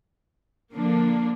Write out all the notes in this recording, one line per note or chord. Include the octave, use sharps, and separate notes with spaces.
D3 F3 A#3 D4